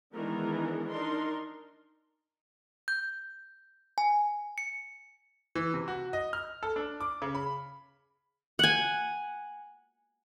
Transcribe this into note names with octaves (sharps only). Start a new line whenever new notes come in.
D#3 E3 G#3 B3 D4 A#4
D4 D#4 A#4 C6
G6
G#5
C#7
E3
C3
F#4
D#5
F6
A4
D4
D6
C#3
B5
F#5 G#5